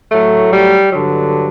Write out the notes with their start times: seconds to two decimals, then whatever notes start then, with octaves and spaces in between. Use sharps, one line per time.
0.11 A2 F#3 A3
0.52 G3
0.92 G2 D3 F#3